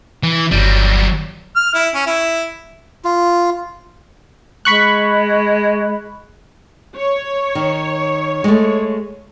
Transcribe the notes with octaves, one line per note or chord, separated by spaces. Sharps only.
E3
G1 D#2 F#3 G3
F6
E4
C#4
E4
F4
G#3 B5 C#6 F#6
C#5
D#3
G#3 A3